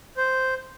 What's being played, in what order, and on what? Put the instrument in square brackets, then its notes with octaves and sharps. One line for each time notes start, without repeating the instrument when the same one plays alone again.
[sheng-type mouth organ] C5